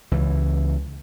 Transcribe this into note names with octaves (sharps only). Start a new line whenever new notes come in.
C#2 E3